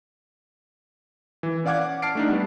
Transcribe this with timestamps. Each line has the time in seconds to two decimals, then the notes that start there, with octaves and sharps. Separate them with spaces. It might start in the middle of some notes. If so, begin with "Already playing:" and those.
1.43 E3
1.65 C#4 D5 F5 F#5 D6 G#6
2.02 A5 F6 C7 D7
2.15 A3 D4 D#4
2.29 G3 B3